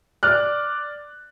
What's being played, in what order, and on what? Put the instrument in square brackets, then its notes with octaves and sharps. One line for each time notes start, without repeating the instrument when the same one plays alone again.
[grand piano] D5 D6 F6 F#6